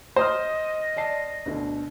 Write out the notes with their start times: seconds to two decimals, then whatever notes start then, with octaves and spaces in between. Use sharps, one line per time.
0.16 C5 D#5 C6 D#6 F6
0.97 D5 A5 C7
1.46 D2 B2 D3